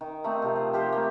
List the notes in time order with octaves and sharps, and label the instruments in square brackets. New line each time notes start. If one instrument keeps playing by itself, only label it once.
[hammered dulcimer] D#3
A3 A#3 C4 D#4
C3 F3
C5
F3 G4 A#4 C5
A3 A#3